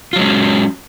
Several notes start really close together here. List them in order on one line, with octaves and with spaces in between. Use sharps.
F4 F#3 G#3 C#4